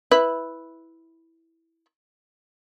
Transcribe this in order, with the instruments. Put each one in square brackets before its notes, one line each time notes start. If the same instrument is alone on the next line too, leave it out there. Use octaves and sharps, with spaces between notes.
[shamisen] E4 B4